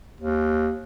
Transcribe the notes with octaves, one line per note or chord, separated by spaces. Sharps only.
D#2